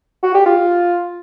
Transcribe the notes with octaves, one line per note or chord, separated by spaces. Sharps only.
F#4
G4
F4